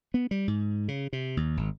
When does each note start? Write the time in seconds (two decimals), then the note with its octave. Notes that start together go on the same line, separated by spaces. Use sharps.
0.14 B3
0.31 G3
0.48 G#2
0.88 C#3
1.13 C3
1.37 D#2
1.57 G#1